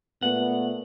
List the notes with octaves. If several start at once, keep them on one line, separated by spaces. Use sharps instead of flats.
A#2 A3 B3 F#5